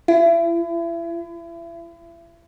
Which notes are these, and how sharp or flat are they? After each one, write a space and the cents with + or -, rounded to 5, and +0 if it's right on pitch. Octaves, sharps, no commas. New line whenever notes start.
E4 +35